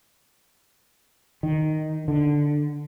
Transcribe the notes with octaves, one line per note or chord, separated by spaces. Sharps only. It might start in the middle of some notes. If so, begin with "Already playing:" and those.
D#3
D3